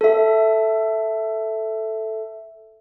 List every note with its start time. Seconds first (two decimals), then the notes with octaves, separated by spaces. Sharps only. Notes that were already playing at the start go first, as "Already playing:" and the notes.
0.01 A4 E5